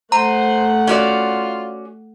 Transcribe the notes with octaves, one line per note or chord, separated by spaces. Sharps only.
A3 C5 F#5 A#5
C#4 F4 F#4 D5